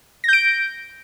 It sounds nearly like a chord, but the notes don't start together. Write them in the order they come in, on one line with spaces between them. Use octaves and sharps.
A#6 G6 D7